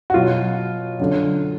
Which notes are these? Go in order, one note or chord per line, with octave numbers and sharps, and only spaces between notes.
F#4
B2 F#3 F4
D3 F#3